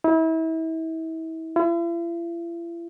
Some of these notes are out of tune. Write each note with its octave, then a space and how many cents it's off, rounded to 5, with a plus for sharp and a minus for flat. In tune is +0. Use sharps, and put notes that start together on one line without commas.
E4 -35
E4 +45